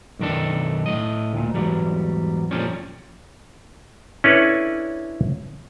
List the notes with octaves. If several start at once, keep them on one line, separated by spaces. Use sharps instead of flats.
B1 F#2 D#3 D4 A4
A2 D#5
D2 A#2
E2 G#2 F#3 G3
F2 A#2 F3 G3 C#4
C#4 D4 E4 A4 B4 C#5